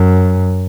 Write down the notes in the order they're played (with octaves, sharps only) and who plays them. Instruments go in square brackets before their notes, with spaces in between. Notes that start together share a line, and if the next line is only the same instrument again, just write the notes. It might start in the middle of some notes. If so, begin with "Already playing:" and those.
Already playing: [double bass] F#2